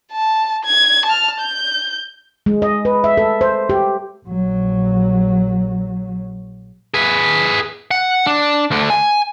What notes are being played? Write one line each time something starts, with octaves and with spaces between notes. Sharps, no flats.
A5
G#6
A5 F6
G6
G#3
D#5
B4
E5
A4
C5
G4
A#1 F#3
G#4 B4
F#5
D4
D2 D3
G#5